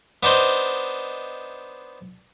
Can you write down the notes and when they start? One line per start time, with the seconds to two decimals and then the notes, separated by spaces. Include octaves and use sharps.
0.23 B3 D4 D#4 C5